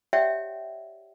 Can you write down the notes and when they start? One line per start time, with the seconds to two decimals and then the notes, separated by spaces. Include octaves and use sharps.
0.13 G4 C#5 D5 E5 F#5 G5